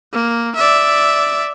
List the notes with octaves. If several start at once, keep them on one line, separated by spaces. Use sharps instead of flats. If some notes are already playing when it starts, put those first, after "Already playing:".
A#3
D5 E5